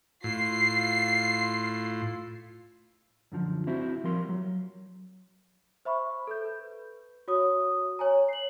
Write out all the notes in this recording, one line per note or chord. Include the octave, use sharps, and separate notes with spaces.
A2 F4 C7
F#2 D3 F3
C4 E4 F#4 C5
F3 G3 A#4 C6
F#3
C5 E5 B5 C#6
A4 B4 G6
B4
F#4 C#5 D#6
C#5 G#5 A#5
C7 F#7